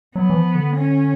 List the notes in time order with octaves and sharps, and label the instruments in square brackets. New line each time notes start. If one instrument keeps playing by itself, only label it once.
[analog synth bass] F#3 [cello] B3
[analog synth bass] E3
F3
D3
[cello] C#4